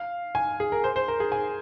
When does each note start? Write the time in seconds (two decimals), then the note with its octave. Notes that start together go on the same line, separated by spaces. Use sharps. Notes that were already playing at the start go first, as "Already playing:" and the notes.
Already playing: F5
0.35 G#5
0.60 G#4
0.72 A#4
0.84 C5
0.96 C5
1.08 A#4
1.20 G#4
1.32 G#5